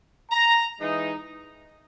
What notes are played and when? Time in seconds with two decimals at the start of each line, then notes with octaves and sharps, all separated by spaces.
0.31 A#5
0.80 E3 G#3 D#4